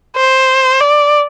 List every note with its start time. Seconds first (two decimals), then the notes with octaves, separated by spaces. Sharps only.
0.17 C5
0.81 D5